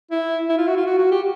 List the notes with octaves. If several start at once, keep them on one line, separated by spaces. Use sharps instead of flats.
E4
E4
F4
F#4
F4
F#4
F#4
G4